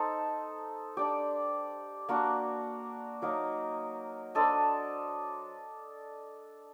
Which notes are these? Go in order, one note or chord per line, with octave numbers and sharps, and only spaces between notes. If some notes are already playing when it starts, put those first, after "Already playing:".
Already playing: D#4 A4 C5
D4 G4 D5
A#3 D4 F#4
F#3 A#3 D#4
D4 A4 C5 D#5